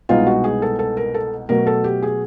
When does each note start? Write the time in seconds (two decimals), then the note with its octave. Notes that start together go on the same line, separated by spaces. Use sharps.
0.09 C2 B2 G#3 B3 D#4 F4
0.26 F#4
0.44 G#4
0.62 A4
0.79 A4
0.97 A#4
1.14 A4
1.49 B2 F#3 A3 A#4
1.67 A4
1.84 G4
2.03 G#4